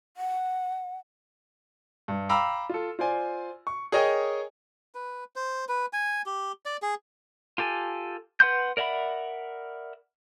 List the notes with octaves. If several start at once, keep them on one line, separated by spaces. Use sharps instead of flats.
F#5
G2
F5 G5 A#5 B5 D6 E6
F4 A4
F4 C5 D5 G#5
C#6
G#4 A#4 C#5 D#5 G5
B4
C5
B4
G#5
G4
D5
G#4
F4 G4 A4 G#5
B4 F#5 C6 G6
A#4 D5 E5 F#5 B5